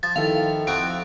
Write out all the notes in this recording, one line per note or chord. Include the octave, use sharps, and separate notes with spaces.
F3 A6
D#3 E4 A4 F5
F2 C4 F#4 D7